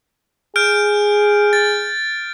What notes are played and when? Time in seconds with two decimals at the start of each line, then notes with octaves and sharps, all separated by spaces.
0.56 G#4 F6 G6 D7
1.53 A6